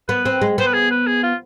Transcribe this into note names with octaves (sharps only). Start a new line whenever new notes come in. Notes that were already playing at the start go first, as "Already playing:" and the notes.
B3 B4
C4
G#3
B3 C5
B4
G#4
B4
G#4
F4